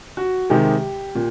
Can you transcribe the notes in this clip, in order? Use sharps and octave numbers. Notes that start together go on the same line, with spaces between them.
F#4
C3 D#3 G#3 G4
A#2